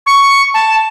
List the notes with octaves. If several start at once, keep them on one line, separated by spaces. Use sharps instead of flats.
C#6
A5